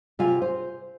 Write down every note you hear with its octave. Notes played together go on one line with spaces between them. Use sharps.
C3 F4 F5 G#5
C5